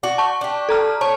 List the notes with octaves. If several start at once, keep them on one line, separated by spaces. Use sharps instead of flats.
F#4 D5
A5 C#6
D4 G4
A4 A#5 F6
C#5 A5